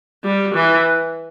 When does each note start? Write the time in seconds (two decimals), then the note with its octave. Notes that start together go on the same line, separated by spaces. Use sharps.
0.24 G3
0.55 E3